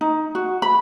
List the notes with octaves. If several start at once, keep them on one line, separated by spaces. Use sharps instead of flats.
D#4
F#4
B5